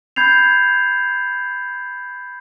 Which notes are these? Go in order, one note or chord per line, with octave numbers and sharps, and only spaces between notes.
B5 G6 G#6 C7 F7